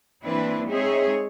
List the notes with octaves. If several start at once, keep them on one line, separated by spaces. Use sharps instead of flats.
E3 A#3 C4 D4 E4 B4
G#3 C4 D#4 G#4 C#5 E5